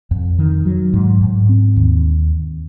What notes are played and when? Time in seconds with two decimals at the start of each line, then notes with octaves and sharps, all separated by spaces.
0.11 F2
0.38 D#3
0.65 F#3
0.93 G#2
1.21 G#2
1.49 C4
1.76 D#2